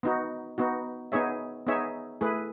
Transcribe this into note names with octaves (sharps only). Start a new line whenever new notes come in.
B3 D#4 F#4
B3 D#4 F#4
B3 D#4 G#4 C#5 E5
B3 D#4 G#4 C#5 E5
A3 E4 G#4 B4